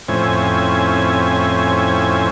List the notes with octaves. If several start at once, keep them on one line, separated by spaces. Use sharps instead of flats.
F2 A2 C4 C#4 E4 G#5